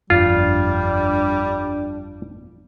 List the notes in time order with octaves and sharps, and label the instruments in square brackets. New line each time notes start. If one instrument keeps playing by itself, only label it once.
[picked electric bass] G1 F2 [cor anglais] G3 [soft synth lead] D4 [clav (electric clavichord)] F4